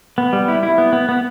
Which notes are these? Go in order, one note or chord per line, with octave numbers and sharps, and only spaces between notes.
B3
G3
E4
E4
B3
B3
B3